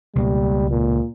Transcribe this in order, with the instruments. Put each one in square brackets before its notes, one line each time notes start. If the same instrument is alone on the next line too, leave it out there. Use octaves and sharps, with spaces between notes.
[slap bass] C#2 B2 A#3 [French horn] G3
[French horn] A#2